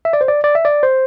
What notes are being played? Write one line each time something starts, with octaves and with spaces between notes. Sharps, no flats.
E5
D5
C5
D5
D5
E5
D5
C5